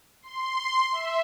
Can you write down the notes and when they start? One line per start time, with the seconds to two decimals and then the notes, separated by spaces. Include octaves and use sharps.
0.22 C6
0.91 E5